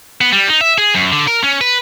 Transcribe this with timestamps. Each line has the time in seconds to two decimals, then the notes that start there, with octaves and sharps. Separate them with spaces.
0.21 B3
0.32 G3
0.48 D#4
0.61 E5
0.78 G#4
0.95 F#2
1.12 D3
1.27 A#4
1.43 C#4
1.61 B4